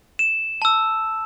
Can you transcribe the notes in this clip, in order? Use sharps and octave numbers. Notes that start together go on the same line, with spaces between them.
E7
A5 E6